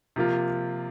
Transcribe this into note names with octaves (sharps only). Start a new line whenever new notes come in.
C3 F3 A#3 F4